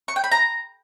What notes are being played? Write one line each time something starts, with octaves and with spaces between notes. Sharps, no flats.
C#6
G5
B5
A#5